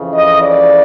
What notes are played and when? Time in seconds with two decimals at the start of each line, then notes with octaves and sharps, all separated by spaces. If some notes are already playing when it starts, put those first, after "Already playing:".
Already playing: F2 C#3 E3
0.14 D#5
0.42 D5